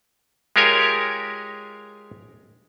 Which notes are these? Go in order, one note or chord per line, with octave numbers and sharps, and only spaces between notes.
G#3 F4 G4 A#4 C#5 G#5